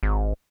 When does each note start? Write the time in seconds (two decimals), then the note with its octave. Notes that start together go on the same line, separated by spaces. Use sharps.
0.03 G#1